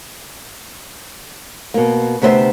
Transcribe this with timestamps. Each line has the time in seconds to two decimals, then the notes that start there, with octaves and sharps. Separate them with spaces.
1.74 B2 A#3
2.22 D2 C3 B3 B4 C5 E5